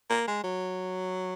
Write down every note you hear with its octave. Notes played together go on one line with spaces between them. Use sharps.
A#3
G#3
F#3